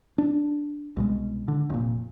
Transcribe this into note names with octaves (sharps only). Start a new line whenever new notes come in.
D4
C2 B2 G#3
D3
F1 A#2